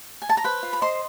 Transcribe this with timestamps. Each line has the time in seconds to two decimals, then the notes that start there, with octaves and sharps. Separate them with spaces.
0.22 G#5
0.29 A5
0.37 A#5
0.44 B4 C5 B5
0.63 F4
0.73 B5
0.81 C5 D#5 C6